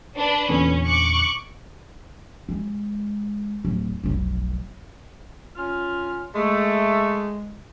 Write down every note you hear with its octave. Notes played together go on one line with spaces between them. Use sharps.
D4 B4
E2 A#2 D3 C#4
C#6 D6 F#6
G#3
D1
F1 B1
C#4 F4 F6
G#3 A3